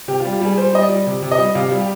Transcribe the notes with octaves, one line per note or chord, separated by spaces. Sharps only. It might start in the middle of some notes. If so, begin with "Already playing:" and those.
C3 G4
F4
G3
G4
G3 G#4
G3 C5
G3 D#5
D5
G3
C3
C3
D#5
G3
C3 F5
G3
G4